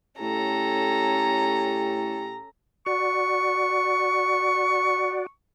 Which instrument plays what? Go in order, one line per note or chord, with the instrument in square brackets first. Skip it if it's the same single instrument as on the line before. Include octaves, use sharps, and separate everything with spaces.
[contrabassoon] A2 [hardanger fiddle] C#4 A4 [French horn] G4 [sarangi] A#5
[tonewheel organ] F#4 D5 [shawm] C#6